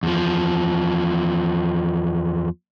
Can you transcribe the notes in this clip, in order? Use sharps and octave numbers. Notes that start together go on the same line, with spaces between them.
E2 F3